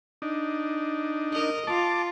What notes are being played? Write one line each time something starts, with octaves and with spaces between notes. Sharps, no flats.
D4 D#4
A#4 D#5
F4 A5 D6